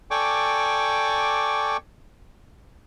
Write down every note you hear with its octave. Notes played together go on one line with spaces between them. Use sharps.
A4 D5 G5 G#5 C#6 D6